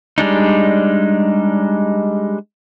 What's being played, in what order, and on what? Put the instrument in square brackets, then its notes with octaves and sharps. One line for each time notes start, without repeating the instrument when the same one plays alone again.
[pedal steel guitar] G3 G#3 D4 D#4